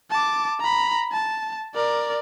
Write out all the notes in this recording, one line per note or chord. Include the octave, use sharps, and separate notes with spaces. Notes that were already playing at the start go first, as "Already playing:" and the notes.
A5 D6
A#5 B5
A5
A#4 D5